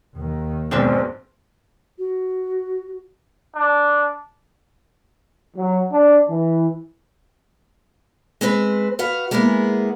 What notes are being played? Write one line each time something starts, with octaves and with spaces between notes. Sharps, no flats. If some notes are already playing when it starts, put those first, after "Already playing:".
D#2 D#3
B1 G#2 B2 C4 D4 C5 E5
F#4
D4
F#3
D4
E3
G#3 C4 B4 C5
F#4 B4 F5
G#3 A#3 B3 E4 G#4